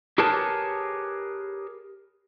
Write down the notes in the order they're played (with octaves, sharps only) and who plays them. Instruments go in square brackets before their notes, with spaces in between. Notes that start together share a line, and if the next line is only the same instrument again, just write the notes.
[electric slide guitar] G4 G#4 A#4 B4 C#5 A5